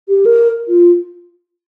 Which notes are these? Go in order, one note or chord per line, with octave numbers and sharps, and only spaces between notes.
G4
A#4
F4